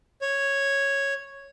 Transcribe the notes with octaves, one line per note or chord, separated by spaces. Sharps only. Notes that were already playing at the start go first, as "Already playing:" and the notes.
C#5